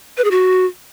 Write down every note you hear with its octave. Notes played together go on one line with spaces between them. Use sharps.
B4
G#4
F#4